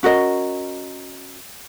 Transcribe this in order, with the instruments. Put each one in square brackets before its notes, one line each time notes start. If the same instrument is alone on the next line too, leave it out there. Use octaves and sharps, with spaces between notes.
[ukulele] C#4 F#4 A#4 D#5